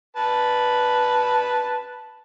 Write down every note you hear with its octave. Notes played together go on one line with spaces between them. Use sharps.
B4 A5